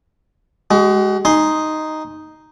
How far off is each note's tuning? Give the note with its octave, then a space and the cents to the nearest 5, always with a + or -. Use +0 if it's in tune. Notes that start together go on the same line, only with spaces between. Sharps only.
G#3 +0 F#4 +45
D#4 +0 G#5 +0 C6 +0